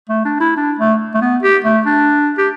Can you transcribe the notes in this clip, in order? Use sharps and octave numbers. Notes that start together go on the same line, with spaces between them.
A3
D4
E4
D4
A3
A3
B3
G4
A3
D4
G4